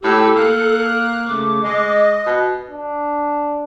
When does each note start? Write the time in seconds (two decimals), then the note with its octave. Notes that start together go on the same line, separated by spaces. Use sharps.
0.03 A2 G4 A4 E6
0.36 A#3 F#6
1.27 C#3 A3 D6
1.63 G#3 D#5
2.26 B2
2.69 D4